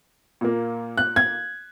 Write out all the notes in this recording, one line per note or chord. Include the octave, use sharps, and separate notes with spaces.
A#2 A#3
F#6
G#6